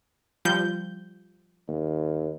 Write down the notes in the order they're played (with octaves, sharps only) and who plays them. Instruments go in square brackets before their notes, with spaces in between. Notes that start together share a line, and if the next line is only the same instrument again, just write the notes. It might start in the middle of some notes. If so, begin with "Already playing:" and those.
[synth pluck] F3 G3 G6
[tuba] D#2